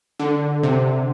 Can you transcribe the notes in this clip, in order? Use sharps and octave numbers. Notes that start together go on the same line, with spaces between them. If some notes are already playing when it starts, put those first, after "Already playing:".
D3
C3